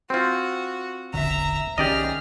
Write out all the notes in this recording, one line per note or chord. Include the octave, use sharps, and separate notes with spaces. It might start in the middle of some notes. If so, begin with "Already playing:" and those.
C4 F4 F#4
E1 A1 D3 E5 A#5
B1 D#3 C#4 G4 G#4 D5 D#5 F6